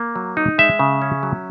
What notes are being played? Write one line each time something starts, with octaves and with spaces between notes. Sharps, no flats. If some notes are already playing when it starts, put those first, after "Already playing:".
Already playing: A#3
F#3
D#4
G#3 E5
C#3
C#4
F#3